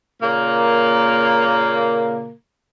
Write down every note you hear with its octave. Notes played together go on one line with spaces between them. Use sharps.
A#2 C#3 A#3